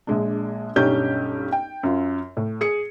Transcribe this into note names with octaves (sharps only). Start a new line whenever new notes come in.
A#1 G#3 D4
B1 G2 C#4 D#4 G4 G6
G5
F#2 F4
A2
G#4 C#7